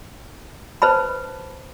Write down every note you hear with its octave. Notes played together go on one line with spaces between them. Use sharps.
B4 C5 A5 B5